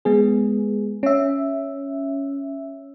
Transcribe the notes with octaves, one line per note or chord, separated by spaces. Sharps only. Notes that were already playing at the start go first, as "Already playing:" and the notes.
G#3 B3 G#4
C#4 E5